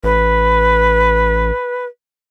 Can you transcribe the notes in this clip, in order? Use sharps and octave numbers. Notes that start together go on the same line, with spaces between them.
A1 B4